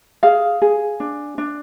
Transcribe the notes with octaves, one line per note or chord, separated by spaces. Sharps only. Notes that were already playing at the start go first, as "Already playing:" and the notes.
G#4 F5
G#4
D4
D4